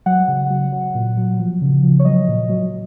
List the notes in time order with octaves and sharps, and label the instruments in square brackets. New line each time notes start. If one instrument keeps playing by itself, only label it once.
[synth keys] F#3 F#5
C#3
F#3
F#3
A#2
F#3
F3
C#3
F3
C#5
F#3 D#5
A#2
F#3